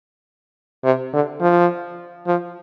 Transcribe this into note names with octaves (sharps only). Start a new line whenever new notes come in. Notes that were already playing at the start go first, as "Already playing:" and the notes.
C3
D3
F3
F3